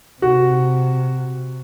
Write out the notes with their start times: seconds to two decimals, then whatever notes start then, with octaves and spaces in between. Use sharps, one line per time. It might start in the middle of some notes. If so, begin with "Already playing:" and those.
0.22 C3 F#4